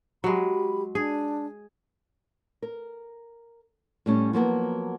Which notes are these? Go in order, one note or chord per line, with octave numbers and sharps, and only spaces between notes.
F#3 G#3 G4 B5
D4 G#4
A#4
A2 G3 C#4
F3 F#3 A#3 B3